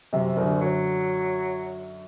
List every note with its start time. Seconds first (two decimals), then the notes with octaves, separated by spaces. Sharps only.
0.13 F#2 C3
0.37 C2 F#2 D3
0.61 F#3